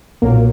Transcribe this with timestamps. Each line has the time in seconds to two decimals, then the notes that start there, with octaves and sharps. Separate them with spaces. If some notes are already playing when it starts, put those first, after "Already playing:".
0.22 B1 A#2 F#3 A#3